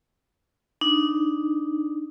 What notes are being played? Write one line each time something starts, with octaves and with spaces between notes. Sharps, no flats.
D4 D#4